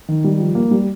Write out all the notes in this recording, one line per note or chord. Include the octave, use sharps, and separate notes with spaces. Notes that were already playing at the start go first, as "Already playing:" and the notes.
D#3
G3
F3
A#3
G3